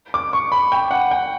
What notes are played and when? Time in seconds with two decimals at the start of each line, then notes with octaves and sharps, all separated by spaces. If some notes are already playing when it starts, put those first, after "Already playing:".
0.14 D6
0.33 C#6
0.52 B5
0.72 G5
0.91 F#5
1.11 G5